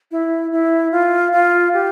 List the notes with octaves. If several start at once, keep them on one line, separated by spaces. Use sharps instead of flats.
E4
E4
F4
F4
G4